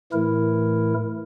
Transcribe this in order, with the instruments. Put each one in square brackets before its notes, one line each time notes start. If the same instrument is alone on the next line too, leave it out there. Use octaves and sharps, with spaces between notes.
[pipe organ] A2 E3 A3 E4 A#4